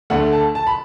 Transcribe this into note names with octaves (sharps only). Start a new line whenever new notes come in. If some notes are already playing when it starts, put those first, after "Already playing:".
D2 D3 A3 F#5
A5
A5
B5